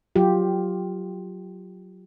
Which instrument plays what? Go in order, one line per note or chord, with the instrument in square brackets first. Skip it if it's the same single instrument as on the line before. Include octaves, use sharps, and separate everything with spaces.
[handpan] F#3 F4 G4